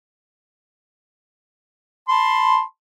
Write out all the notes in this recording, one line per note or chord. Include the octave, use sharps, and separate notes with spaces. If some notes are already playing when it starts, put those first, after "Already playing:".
A5 B5 C6